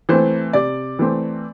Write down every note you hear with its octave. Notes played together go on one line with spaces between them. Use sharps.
E3 A3 C4 C5
C3 D5
E3 A3 C4